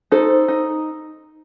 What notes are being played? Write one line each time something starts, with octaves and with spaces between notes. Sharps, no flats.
D#4 A4 C5
D#4